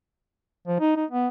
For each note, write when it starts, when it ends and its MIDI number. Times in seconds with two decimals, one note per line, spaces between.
0.67 0.80 53
0.80 0.95 63
0.96 1.05 63
1.11 1.28 59